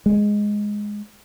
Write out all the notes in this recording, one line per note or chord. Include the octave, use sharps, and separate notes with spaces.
G#3